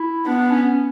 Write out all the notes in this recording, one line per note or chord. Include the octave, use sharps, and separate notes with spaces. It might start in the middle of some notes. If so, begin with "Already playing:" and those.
Already playing: E4
B3 D4
D4
C#4
C#4